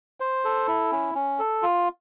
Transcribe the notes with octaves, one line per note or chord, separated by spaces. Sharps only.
C5
A4
E4
C#4
C#4
A4
F4